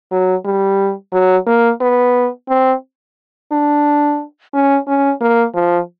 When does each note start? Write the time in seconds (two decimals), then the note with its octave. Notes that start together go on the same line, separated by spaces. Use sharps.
0.11 F#3
0.45 G3
1.13 F#3
1.47 A#3
1.81 B3
2.49 C4
3.52 D4
4.54 C#4
4.88 C#4
5.21 A#3
5.54 F3